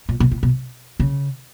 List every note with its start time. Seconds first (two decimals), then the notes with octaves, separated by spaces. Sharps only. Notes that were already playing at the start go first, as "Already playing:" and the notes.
0.09 A#2
0.20 B2
0.31 A2
0.43 B2
1.00 C#3